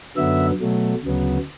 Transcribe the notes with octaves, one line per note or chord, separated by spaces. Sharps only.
F#2 D3 F#3 B3 E5
B2 F#3 A3
D2 C#3 F#3 B3